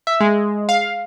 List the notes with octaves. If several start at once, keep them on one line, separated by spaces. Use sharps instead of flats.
E5
G#3
F5